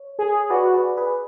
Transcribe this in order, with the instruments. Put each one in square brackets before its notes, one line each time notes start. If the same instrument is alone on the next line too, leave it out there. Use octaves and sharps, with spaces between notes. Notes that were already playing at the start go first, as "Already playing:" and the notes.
Already playing: [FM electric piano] C#5
[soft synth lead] G#4
[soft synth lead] F#4 [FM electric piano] B4 D5
[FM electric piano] G#4 B4
G#4 B4